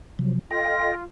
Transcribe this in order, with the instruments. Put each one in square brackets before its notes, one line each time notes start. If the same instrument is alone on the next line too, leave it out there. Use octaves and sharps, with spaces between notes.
[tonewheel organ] C3 F3 F#3
[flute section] F4 [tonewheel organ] A4 D#5 G5 [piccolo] A#6